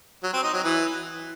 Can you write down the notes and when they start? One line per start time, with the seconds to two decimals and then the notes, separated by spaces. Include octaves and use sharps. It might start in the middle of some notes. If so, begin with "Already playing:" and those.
0.23 F#3
0.33 C4
0.43 D#4
0.54 F#3
0.64 E3